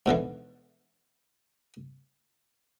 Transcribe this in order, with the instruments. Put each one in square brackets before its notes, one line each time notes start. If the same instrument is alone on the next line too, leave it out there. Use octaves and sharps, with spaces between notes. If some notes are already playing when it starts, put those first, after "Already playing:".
[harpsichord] G#2 B2 D3 E3